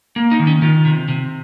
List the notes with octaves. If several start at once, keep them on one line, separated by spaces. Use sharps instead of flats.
A#3
D#4
D#3
C#4
D#3 F4
C3
C3